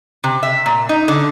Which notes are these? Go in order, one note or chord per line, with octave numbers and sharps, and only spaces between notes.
C3
E5
A#2
D#4
D3